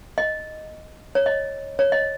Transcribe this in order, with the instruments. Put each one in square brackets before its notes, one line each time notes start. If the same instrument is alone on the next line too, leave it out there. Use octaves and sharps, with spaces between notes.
[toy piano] D#5
C#5
D#5
C#5
D#5